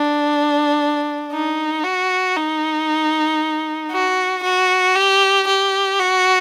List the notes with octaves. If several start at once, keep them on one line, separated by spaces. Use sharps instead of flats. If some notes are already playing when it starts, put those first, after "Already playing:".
Already playing: D4
D#4
F#4
D#4
F#4
F#4
G4
G4
F#4